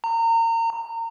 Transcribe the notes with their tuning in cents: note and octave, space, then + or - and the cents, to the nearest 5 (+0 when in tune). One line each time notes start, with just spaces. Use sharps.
A#5 -30